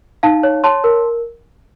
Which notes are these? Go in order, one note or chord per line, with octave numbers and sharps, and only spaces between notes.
D#4 F5 A5
C#5
C#5 A5 C6
A#4